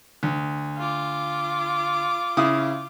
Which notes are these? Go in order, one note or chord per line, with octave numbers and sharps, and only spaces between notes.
D2
F4 D6
C#3 E4 D#6